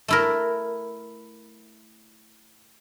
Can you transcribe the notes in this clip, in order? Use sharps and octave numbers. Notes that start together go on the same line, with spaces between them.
A3 E4 A#4